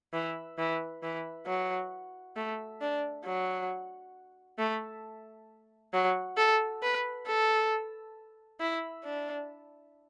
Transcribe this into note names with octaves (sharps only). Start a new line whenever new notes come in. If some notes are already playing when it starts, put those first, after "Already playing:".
E3
E3
E3
F#3
A3
D4
F#3
A3
F#3
A4
B4
A4
E4
D4